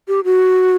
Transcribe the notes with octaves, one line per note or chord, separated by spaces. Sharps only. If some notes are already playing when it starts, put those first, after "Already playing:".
G4
F#4